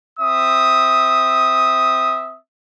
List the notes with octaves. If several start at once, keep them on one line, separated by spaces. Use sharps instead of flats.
C4 E5 D#6